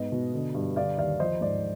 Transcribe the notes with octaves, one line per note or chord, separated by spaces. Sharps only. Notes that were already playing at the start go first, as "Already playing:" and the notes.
Already playing: G#2 B3 D#5
B2
D3
G2
D3 D5 F5
D#2 D5 F5
F3 C5 D#5
G#2 D5